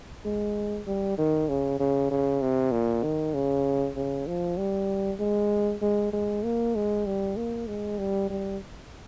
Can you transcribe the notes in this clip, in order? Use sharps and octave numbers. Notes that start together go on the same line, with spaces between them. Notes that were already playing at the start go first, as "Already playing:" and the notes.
G#3
G3
D#3
C#3
C#3
C#3
C3
A#2
D#3
C#3
C#3
F3
G3
G#3
G#3
G#3
A#3
G#3
G3
A#3
G#3
G3
G3